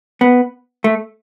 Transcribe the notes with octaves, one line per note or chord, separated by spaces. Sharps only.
B3
A3